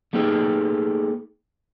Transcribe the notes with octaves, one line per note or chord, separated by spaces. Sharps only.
A3 A#3 D#4 G4 G#4 B4